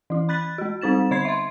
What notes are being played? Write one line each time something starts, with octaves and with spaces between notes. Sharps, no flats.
E3 E4
B5 F#6 A6 B6
G#3 F#4
G3 C4 D#4 A6 E7
D3 D#5 B5 G#6 C7
E5 C6